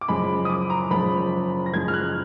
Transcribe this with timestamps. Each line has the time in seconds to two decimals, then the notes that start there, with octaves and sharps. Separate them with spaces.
0.01 D6
0.08 F#1 F#2 F3 G#3 B5
0.45 D#6
0.50 D6
0.70 A#5
0.90 F#1 F#2 F3 G#3 B5
1.66 A#6
1.73 F#1 F#2 F3 G#3 G#6
1.88 F6
1.94 F#6